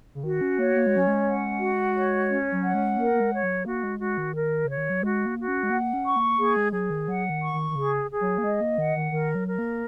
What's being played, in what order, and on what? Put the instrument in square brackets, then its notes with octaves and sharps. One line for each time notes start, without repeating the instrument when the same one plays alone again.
[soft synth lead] C#3
[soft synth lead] D#3 [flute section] F#4
[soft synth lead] C#4
[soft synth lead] A#3 [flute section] C#5
[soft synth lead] A#3
G#3
[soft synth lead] F#3 [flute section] C#4
[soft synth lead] G#3
[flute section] F#5
F#4
C#5
C#4
[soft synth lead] F#3
[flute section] F#5
[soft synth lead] G#3
[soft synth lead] A#3 [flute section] A#4
[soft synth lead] A#3
G#3
[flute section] C#5
[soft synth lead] F#3
[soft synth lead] A#3 [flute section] F#4
[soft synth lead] G#3
[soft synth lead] G#3 [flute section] F#4
[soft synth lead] D#3
[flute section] A#4
[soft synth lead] C#3 [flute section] C#5
[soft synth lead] D#3
F#3
[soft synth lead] G#3 [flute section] F#4
[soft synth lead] A#3
[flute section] F#4
[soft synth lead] C#4
G#3
[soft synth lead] A#3 [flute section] F#5
[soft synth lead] C#4
[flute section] C#6
[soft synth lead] A#3
[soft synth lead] A#3 [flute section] G#4
[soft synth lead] G#3
[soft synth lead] F#3 [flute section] G#4
[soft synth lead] D#3
[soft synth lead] F#3 [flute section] F#5
[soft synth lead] D#3
[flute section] C#6
[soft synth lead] D#3
D#3
[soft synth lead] C#3 [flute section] G#4
[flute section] G#4
[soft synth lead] F#3
A#3
[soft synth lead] G#3 [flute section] D#5
[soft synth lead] A#3
[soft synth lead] D#3 [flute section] F#5
[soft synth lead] D#3
[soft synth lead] D#3 [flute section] A#4
[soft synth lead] F#3
[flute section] A#4
[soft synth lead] A#3